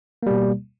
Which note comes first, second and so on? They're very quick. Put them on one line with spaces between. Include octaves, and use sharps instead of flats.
A#3 G3 B2